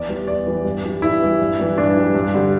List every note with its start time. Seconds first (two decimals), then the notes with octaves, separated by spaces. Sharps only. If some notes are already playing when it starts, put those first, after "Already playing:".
Already playing: E2 D5
0.09 E3 G3
0.27 E2 D5
0.47 E3 G3
0.65 G2
0.84 E3 G3
1.02 G2 E4
1.22 E3 G3
1.41 G2
1.59 E3 G3
1.78 G2 D4
1.96 E3 G3
2.15 G2
2.34 D3 G3